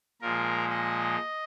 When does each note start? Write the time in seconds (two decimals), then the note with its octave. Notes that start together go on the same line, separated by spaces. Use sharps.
0.21 A#2 F3 G#3 A#4
0.70 D#5